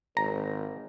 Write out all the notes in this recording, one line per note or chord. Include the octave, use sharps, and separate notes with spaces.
G#1 A#5